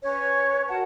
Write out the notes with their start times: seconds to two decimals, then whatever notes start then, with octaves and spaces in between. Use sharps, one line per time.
0.03 C#4 B4 C#5
0.69 F#4 A#4 F#5 A5